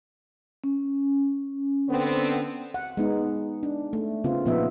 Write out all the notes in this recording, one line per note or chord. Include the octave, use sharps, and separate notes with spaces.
C#4
D3 B3 C4
F#5
G#3 B3 D#4
D4
A3
C#3 B3 C4 F4
A#2 F3 B3 D#4 E5